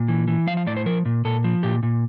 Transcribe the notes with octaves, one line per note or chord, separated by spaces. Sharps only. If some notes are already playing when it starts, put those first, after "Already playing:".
Already playing: A#2
E3
E3
F3 F5
F5
A2 D5
C5
F3 A#4
A#2
A#2 A4
F3
A#2 G4
A#2